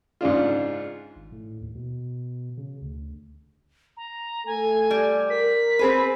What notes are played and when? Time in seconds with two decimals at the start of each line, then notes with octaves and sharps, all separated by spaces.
0.21 G#2 C#3 D4 F4
1.16 G#1
1.32 A2
1.61 D#2
1.75 B2
2.57 C#3
2.81 D2
3.97 A#5
4.46 A3 A4 G#5
4.91 G3
5.30 A#4 B6
5.79 C4 G#4 B4 C5